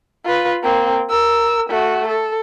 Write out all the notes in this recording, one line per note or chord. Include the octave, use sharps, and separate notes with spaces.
F4 B4
A#3 C4
A#4 E6
A3 F#4
A4